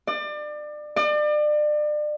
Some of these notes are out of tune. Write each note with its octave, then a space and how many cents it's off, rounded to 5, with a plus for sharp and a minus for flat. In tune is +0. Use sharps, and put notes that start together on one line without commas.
D5 +30
D5 +35